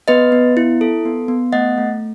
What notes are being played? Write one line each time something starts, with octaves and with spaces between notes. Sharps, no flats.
B3 B4 D#5
B3
E4
A4
B3
B3
A3 D#5 F#5
A3